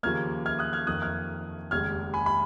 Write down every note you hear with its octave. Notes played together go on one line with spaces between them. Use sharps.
D#2 C#3 F3 A#3 F6 G#6
F6 G#6
D#6 F#6
F6 G#6
F2 D#3 A#3 D#6 F#6
F6 G#6
F1 D#2 C#3 G#3 F6 G#6
G#5 B5
B5